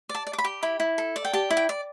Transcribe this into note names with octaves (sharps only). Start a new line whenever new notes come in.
D5
A5
D5
D6
B5
G4
E4 B5
E4
A4
D5
G5
G4 A5
E4
G5
D5